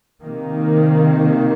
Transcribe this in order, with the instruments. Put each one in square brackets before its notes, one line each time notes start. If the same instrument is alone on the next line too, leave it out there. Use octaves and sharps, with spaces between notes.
[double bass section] C3 D#3 A#3